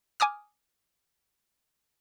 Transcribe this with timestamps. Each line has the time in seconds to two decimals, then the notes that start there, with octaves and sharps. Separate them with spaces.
0.20 G#5 D6 D#6 F6